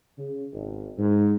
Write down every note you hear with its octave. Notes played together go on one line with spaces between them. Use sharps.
C#3
G#1
G#2